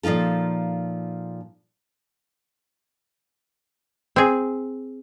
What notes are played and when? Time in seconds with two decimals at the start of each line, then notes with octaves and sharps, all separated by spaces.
0.03 A#2 F3 D#4 F4 A4
4.16 C4 G#4